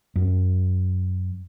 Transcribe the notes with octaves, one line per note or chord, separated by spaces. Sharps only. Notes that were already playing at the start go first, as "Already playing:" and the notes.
F#2